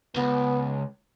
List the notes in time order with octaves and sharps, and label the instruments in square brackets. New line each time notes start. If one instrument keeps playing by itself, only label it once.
[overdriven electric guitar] C#2 [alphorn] B3